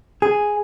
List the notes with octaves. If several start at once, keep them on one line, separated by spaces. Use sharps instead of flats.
G#4